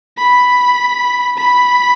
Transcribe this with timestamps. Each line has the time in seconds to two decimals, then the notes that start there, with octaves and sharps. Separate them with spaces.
0.17 B5
1.37 B5